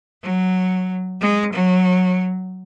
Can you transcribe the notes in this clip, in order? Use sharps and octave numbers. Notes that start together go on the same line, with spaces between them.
F#3
G#3
F#3